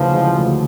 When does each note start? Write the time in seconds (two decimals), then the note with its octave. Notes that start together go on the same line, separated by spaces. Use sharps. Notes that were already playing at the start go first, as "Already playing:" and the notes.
Already playing: D2 C#3 E3 F3 G#3
0.14 G#3
0.36 D2